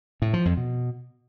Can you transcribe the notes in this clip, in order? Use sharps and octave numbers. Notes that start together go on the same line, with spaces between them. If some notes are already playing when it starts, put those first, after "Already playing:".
A2
F3
F2
B2